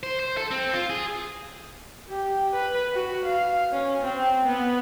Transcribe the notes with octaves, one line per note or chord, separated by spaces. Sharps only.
C5
C5
A4
C4
F4
G#4
G4
B4
F#4
F5
C#4
C4
B3